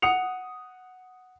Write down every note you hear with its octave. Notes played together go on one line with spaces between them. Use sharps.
F#5 D#6 C#7 F7